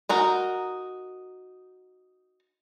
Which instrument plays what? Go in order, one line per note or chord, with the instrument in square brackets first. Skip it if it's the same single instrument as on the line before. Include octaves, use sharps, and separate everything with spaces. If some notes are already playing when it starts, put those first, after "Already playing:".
[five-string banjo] D#4 F#4 A#4